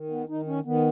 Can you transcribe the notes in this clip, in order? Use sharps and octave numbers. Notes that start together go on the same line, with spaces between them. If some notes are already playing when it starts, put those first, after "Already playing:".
Already playing: D#3
B3
D#3 D#4
C#4
D#3 B3